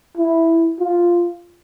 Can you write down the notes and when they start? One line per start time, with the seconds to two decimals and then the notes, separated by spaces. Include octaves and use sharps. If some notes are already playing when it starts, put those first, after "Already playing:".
0.18 E4
0.79 F4